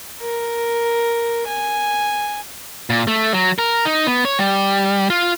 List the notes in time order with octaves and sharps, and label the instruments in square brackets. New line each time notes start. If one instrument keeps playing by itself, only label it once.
[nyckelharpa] A#4
G#5
[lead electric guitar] A#2
A3
F#3
A#4
D#4
B3
C#5
G3
F4